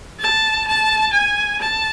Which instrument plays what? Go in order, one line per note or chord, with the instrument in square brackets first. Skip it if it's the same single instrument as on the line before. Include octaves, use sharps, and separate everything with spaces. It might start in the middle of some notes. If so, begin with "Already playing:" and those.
[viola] A5
A5
G#5
A5